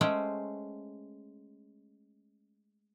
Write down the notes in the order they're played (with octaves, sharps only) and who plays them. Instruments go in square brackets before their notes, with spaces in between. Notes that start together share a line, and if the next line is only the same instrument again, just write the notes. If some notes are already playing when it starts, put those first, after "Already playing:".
[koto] G#3 A3 C#4 C5 G5